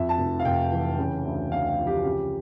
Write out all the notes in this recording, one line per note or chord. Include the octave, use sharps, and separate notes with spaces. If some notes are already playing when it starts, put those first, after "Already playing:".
Already playing: F2 F3 E5
A5
F1
F5
F1 G5
E3
C#3
D2
D2 F5
F5
F3
G4
C#3 G4